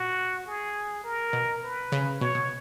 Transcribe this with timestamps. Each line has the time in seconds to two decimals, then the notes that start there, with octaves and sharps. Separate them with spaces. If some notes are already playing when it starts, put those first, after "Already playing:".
Already playing: A#2 F#4
0.46 G#4
1.04 A#4
1.33 B2
1.63 B4
1.92 C#3
2.20 B2 C#5
2.35 B2